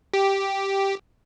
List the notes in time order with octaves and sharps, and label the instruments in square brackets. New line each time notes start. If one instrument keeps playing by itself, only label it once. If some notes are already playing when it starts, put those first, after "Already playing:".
[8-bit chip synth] G4